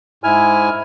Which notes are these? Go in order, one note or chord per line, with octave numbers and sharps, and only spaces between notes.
G#2 E4 G#5 F6